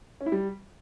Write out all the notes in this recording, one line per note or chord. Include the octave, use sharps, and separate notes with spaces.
C#4
E4
G3